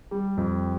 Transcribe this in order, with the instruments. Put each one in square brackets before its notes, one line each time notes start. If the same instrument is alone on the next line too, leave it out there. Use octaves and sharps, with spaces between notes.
[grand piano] G3
F2